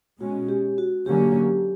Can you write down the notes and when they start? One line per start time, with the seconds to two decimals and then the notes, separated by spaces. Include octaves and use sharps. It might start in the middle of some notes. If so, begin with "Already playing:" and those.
0.20 B2 G#3 C#4 F#4
0.49 G4
0.78 F#4
1.06 D3 F#3 A#3 C#4 G4